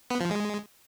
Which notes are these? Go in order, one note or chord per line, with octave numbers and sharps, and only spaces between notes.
B3
F3
G#3